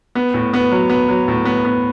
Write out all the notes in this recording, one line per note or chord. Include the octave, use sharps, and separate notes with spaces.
B3
A2
B3
F#3
B3
F#3
A2
B3
B3